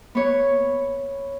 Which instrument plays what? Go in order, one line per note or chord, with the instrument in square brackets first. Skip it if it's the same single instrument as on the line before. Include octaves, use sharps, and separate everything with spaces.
[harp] B3 C#5